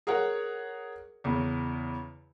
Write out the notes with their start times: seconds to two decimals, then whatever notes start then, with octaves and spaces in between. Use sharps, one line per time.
0.07 G#4 A#4 C#5 F#5
1.24 E2 C#3